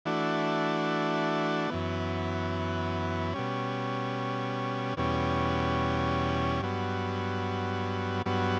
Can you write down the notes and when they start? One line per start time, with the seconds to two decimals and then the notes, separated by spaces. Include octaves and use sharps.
0.05 E3 A3 D4 F#4
1.70 F#2 E3 B3
3.34 B2 G3 C#4
4.97 E2 B2 G3 C#4
6.62 G2 F#3 B3
8.26 G2 F#3 B3